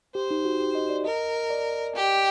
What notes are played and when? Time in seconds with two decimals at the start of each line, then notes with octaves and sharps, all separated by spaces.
0.15 G4 C5
0.31 D#4
0.45 F#4
0.60 G4
0.75 D#5
0.90 D5
1.05 A#4 D#5
1.50 D5
1.95 G4